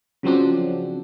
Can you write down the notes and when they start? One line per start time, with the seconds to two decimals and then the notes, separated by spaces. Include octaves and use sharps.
0.23 C#3 F3 F#3 C4 D4